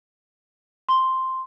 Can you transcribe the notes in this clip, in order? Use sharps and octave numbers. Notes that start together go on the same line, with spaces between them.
C6